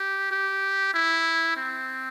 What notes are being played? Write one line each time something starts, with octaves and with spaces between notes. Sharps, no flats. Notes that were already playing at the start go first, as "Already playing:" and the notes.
Already playing: G4
G4
E4
C4